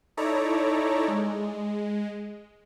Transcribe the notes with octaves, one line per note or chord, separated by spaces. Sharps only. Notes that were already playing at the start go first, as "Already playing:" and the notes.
D#4 E4 A4 C#5 D5 A#5
G#3